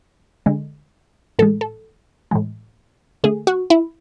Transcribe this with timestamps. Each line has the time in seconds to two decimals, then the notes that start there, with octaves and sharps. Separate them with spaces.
0.46 D3 G#3
1.39 A2 E3 G#3 A4
1.61 A4
2.31 A2 E3 G#3
3.24 D3 A3 G#4
3.47 F#4
3.70 E4